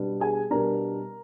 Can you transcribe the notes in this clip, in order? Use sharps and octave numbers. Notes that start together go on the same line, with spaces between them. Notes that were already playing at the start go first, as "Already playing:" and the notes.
Already playing: B2 G3 B3 D4
G#4 G#5
B2 G3 B3 D4 A#4 A#5